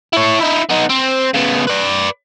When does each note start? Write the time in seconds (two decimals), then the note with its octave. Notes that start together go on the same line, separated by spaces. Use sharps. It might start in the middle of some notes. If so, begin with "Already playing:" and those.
0.13 E4 C#5
0.41 D#4 E4
0.70 B3 D#4
0.90 C4
1.34 C#3 B3
1.67 B4 D5